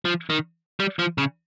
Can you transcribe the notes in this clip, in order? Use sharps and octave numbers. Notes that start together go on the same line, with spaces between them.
F3
D#3
G3
F3
C#3